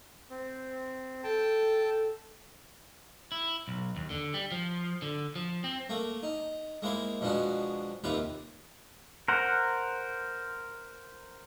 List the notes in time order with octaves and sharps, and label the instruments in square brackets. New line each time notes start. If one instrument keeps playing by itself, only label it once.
[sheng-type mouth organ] C4
[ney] A4 [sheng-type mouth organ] G5 A5
[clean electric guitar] E4
B1
D#2
D3
G3
F3
D3
F3
C4
[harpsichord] A3 A#3
D#4
G#3 A#3 E4 C5
B2 F3 G#3 D4 F#4
D#2 C3 A#3 F4 B4
[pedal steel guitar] A#4 C5 F#5